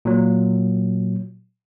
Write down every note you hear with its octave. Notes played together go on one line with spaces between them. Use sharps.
A#2 F#3